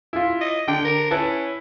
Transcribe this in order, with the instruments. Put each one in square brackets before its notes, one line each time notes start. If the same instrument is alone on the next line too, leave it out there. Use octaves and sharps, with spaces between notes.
[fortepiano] E4 F4
[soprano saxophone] D#5
[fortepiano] D3 [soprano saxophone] G5
[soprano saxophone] A#4
[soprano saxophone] C#4 [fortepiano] E4 B4 A5